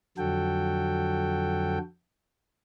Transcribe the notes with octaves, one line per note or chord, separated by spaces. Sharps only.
F2 D3 F#3 F#4 A4 G5